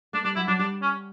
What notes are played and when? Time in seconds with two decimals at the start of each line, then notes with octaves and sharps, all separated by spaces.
0.13 A3 D4
0.24 G3 D4
0.36 F#3 E4
0.48 F#3 D4
0.59 G3 D4
0.82 C#4